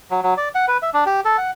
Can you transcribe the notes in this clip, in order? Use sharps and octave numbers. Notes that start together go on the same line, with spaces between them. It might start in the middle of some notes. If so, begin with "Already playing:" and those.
F#3
F#3
D5
F#5
B4
E5
D4
G4
A4
F#5